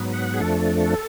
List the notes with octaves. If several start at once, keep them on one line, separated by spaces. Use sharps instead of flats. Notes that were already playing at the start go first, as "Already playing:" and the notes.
Already playing: G#2 F#3 B3
F#5
G#4
F2 F3 A3 D4 A4